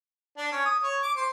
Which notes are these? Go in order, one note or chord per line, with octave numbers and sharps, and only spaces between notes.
D4
C#4
D#6
C#5
D6
C5